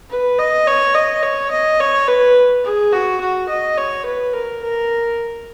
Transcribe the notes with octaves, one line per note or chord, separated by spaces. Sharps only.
B4
D#5
C#5
D#5
C#5
D#5
C#5
B4
G#4
F#4
F#4
D#5
C#5
B4
A#4
A#4